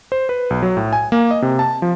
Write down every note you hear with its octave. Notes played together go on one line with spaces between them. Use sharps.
C5
B4
B1
F#3
A2
G#5
A#3
D#5
C3
A5
F3